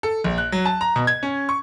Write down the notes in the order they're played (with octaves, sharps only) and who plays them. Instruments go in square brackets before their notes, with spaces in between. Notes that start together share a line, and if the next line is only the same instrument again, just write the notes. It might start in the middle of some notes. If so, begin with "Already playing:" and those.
[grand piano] A4
A#1
F#6
F#3
A5
A#5
B2
G#6
C#4
C#6